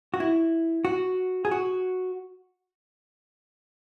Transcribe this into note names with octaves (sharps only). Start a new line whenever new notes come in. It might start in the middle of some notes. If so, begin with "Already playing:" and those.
F#4
E4
F#4
G#4
F#4